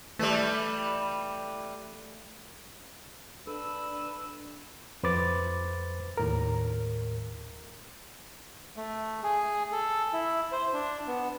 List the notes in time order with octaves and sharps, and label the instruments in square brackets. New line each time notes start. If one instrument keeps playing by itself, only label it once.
[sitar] E3 G3 [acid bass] A3
[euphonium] D4 [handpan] A4 [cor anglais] B4 [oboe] E6
[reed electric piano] F2 B4 C5 D6 A6
D#2 A2 A#4
[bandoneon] A3
G#4
A4
E4
C5
D4
B3